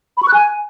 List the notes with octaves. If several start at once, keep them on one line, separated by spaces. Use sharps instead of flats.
B5
C#6
F#6
G#5